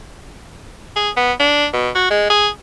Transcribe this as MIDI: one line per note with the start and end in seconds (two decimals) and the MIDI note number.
0.96 1.10 68
1.17 1.32 59
1.40 1.66 62
1.73 1.90 47
1.95 2.08 66
2.11 2.28 56
2.30 2.48 68